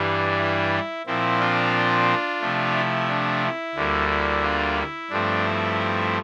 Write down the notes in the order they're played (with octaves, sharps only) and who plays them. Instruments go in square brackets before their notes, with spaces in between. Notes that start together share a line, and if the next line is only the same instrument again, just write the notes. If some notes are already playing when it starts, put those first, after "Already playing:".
Already playing: [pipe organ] G2 E3 G3 D4
E4
A#2 F3 C4 E4
D4 F4
C3 F3 A3
E4
D4
E4
D2 D3 G3 A#3
E4
D4 F4
E4
G2 F3 A3 C4 D4
E4